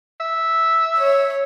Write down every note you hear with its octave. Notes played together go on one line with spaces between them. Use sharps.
E5
C#5